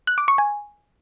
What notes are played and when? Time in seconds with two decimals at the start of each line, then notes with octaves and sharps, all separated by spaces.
0.07 F#6
0.18 D6
0.28 C#6
0.38 G#5